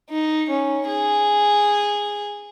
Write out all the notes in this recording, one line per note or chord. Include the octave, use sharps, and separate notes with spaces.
D#4
C#4
G#4